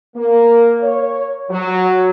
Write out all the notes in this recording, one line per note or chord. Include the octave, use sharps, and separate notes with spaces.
A#3
C#5
F#3